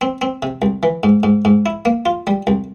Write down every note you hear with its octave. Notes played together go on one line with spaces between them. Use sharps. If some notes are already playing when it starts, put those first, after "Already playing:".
C4
C4
C3
C2
E3
G#2
G#2
G#2
E4
A#3
F4
G3
C2